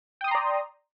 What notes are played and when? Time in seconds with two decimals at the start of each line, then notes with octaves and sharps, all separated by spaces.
0.21 G5
0.24 D#6
0.28 C6
0.31 A#5
0.35 D5